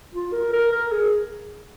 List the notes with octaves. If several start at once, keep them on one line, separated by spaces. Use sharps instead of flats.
F4
A#4
A#4
A#4
G#4